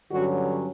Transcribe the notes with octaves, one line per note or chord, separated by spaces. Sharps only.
G2 D3 F#3 C#4 F#4